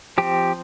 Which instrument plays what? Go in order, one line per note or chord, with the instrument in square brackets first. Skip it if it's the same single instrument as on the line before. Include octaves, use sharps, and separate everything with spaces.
[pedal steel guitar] F3 C4 G4